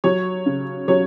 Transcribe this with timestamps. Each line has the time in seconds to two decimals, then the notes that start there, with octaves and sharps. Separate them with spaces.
0.04 F#3 C#5
0.46 C#3
0.88 F#3 C#5